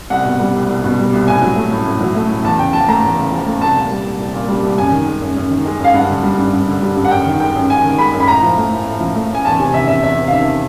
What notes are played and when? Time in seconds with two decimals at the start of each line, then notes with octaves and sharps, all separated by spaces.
0.10 C2 F#5
0.25 B2
0.40 G3
0.55 C2
0.69 C2
0.84 B2
0.98 G3
1.13 C2
1.27 A2 G#5
1.42 F#3
1.56 A3
1.71 A2
1.86 A2
2.01 F#3
2.15 A3
2.29 A2
2.44 E2 A5
2.59 C#3 G5
2.73 F3 A5
2.88 A3 A#5
3.03 E2
3.17 C#3
3.32 F3
3.47 A3
3.61 C2 A5
3.76 A#2
3.90 G3
4.05 C2
4.19 C2
4.34 A#2
4.49 G3
4.63 C2
4.78 F#2 G#5
4.92 D#3
5.07 G#3
5.21 F#2
5.37 F#2
5.50 D#3
5.66 G#3
5.80 F#2 F5
5.94 G2 F#5
6.10 D3
6.23 G3
6.38 G2
6.53 G2
6.68 D3
6.82 G3
6.96 G2
7.05 F#5
7.11 F#2 G5
7.26 D#3
7.40 G#3 G5
7.56 F#2
7.70 F#2 G#5
7.84 D#3
7.98 G#3 B5
8.13 F#2
8.20 B5
8.28 A2 A#5
8.43 F3
8.57 A3
8.71 A2
8.86 A2
9.00 F3
9.15 A3
9.30 A2 G#5
9.45 E2 A5
9.60 C3 G#5
9.74 D#3 E5
9.88 E2 E5
10.03 E2 E5
10.18 C3
10.27 F5
10.32 D#3 E5